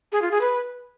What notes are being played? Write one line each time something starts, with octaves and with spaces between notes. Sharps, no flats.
G#4
F4
G#4
B4